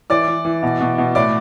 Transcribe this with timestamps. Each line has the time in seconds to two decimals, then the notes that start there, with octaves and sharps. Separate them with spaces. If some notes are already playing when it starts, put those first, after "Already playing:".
0.10 E3 D5 D6
0.28 E3
0.45 E3
0.63 B2
0.80 B2
0.98 B2
1.15 A2 D5 D6